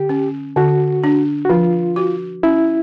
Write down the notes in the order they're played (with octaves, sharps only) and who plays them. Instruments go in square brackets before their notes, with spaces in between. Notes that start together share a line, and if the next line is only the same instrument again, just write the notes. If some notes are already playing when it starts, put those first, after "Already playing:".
Already playing: [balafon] D3 [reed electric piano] G4
[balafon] C#4
[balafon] D3 [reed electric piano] F#4
[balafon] D4
[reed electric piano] F#4
[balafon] F3 [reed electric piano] F4
[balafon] F#4
[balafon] C#4 [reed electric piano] E4